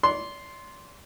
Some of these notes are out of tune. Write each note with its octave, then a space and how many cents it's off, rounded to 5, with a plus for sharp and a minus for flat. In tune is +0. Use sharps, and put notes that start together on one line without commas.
D5 -40 C6 +0